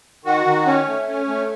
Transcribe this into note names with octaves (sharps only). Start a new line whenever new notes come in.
D#3 F#4
D#3
C#4
A3
C#4
A3